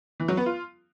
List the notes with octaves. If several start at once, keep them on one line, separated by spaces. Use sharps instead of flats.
E3
F#3
B3
F4